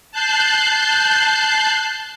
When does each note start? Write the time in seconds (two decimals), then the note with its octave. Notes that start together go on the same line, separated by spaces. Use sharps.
0.12 A5 F#6 G6 C7